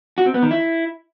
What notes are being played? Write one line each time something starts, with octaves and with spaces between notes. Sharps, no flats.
F#4
C4
B3
D#3
E4